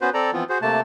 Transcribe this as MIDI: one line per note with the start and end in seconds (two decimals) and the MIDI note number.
0.01 0.09 59
0.01 0.09 61
0.01 0.09 66
0.01 0.09 71
0.01 0.09 72
0.14 0.31 60
0.14 0.31 69
0.14 0.31 74
0.14 0.31 82
0.33 0.44 52
0.33 0.44 53
0.33 0.44 59
0.33 0.44 60
0.33 0.44 65
0.49 0.58 66
0.49 0.58 68
0.49 0.58 72
0.62 0.80 48
0.62 0.80 57
0.62 0.80 58
0.62 0.80 81